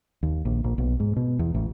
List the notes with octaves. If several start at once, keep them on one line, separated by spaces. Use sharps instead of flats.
D#2
A#1
A#1
B1
G#2
B2
E2
A1